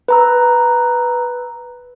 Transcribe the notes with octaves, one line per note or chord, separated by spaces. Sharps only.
B4 A#5 E6